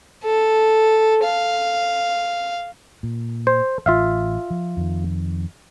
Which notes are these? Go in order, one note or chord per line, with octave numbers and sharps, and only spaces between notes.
A4
F5
A#2
C5
A1 F4 E5 F5
F3
F2 D#3